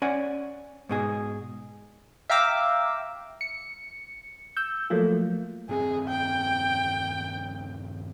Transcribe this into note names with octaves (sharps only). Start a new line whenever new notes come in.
C#4 D5 F#5 G#5
G#2 B2 G#4
E5 F5 G5 A#5 D6 E6
C#7
E6 G6
F3 F#3 A3 A#3 F4
D#1 G2 C4 G#4
G5